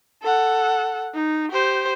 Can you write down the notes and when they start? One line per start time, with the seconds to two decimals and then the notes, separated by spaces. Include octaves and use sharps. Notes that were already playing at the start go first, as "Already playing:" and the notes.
0.22 A4 F#5
1.14 D#4
1.52 G4 C5